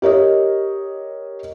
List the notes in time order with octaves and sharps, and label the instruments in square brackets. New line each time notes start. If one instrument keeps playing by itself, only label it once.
[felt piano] G4 A#4 C#5 D#5